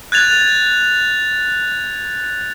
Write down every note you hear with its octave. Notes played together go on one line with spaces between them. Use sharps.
F#6 G#6 A6 F7